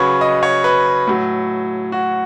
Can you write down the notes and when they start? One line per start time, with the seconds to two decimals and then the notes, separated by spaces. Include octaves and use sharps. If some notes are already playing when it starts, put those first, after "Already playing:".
Already playing: C#3 F#3 B4 C#5
0.21 D#5
0.43 C#5
0.64 B4
1.07 A2 F#3
1.92 F#4